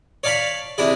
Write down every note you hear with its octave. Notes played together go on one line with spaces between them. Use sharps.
C#5 D5 F5 A5 B5
C3 D4 E4 G#4